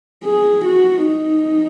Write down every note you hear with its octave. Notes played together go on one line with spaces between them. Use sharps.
G#4
F#4
D#4